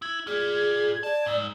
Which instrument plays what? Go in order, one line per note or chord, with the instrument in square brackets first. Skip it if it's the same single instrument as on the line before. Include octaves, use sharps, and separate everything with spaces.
[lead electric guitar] E4 [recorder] G#6
[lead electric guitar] F4 D5 [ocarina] G#4
[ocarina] D5 [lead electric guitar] A5
[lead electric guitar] G#2 [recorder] E6